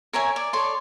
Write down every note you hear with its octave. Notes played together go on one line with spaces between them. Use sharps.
A#4 C#5 E5 G#5
D5
A4 C#5 D5 C6